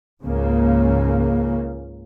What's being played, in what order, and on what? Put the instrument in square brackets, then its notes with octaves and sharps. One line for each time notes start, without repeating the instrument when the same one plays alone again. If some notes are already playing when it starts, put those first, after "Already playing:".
[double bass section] C#2 G#2 C#3 A#3